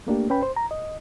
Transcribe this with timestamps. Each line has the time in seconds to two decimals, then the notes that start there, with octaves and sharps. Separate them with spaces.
0.07 A3 A#3 D4 G4
0.30 C#4 B4 G5 B5
0.43 C5
0.56 A#5
0.71 D#5